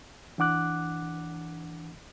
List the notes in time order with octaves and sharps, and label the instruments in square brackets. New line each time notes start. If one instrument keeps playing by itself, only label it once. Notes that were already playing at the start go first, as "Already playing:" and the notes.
[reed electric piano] E3 D4 F#5 D6 F#6